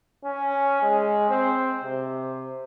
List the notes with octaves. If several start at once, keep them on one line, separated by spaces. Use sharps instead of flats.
C#4
G#3
C4
C3